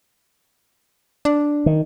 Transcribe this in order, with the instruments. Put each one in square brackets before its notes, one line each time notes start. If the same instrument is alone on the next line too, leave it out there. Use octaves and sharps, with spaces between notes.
[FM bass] D4
[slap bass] D#3